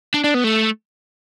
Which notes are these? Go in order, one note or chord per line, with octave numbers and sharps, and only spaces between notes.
D4
D4
B3
A3